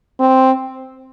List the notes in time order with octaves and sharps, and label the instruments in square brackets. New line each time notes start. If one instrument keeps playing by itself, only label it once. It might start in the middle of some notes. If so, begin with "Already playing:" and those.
[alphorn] C4